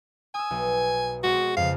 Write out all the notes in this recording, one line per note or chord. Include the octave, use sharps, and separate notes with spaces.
G#5 D#6 E6
B1
G#3 C4 F#4
F2 C#3 F5